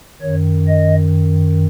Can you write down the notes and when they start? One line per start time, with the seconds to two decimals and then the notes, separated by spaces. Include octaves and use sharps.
0.21 F#2 D#3 C#5
0.67 D#5